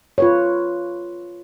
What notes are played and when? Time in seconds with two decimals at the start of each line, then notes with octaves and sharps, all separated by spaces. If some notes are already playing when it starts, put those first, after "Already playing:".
0.18 F4 B4 C#5